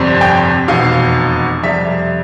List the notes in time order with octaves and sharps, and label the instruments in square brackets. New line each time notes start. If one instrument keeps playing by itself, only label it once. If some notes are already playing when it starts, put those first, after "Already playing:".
Already playing: [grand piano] G1 F2 C3 G3 C4
G5
F1 E2 B2 F5
F2 C3 G3 E5